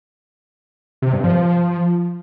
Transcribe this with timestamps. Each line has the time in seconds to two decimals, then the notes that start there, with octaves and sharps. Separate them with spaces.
1.02 C3
1.13 G2
1.24 F3